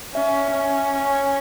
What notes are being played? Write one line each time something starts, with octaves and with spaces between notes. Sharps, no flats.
C#4 E5
C#4 G#5